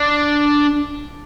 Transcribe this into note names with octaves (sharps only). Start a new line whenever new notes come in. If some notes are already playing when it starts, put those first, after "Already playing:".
Already playing: D4